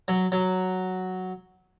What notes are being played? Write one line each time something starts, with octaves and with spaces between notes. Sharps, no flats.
F#3
F#3